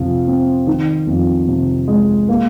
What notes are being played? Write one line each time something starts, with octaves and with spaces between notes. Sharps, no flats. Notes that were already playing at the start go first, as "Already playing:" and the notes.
Already playing: F2 C3 F3
C4
D#3
F2
C3
G#3
A#3